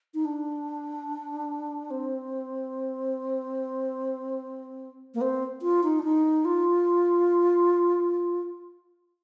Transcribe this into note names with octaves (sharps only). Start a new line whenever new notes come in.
D#4
D4
C4
A#3
C4
F4
D#4
D4
D#4
F4